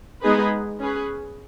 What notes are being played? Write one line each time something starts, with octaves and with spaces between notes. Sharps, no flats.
G#3 B3 D#4 G#4 B4
C#4 G#4 B4